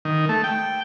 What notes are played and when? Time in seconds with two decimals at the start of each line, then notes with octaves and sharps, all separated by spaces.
0.05 D#3
0.29 A3
0.44 G5